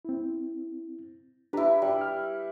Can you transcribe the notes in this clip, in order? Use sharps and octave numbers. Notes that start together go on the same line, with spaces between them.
C4 E4
D4 E4 G4 B4 A#5
G3
F6